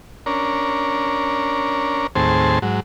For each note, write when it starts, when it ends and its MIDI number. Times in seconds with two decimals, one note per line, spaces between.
0.26 2.07 61
0.26 2.07 62
0.26 2.07 70
2.15 2.59 39
2.15 2.59 45
2.15 2.59 60
2.15 2.59 68
2.15 2.59 72
2.15 2.59 81
2.62 2.80 44
2.62 2.80 54